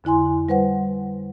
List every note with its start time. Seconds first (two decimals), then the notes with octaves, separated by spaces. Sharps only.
0.04 F2 D3 E4 G#5 C6
0.49 G3 B4 C5 F#5